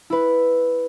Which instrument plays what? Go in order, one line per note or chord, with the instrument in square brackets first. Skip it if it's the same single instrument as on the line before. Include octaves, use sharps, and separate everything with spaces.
[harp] E4 B4